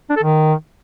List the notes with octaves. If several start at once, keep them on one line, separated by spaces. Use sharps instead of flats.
D4
A4
D#3